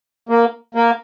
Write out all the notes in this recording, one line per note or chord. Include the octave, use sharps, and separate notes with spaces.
A#3
A#3